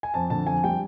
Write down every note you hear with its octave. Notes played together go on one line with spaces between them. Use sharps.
G#5
F2 A5
D3 A5
F2 G#5
G3 G5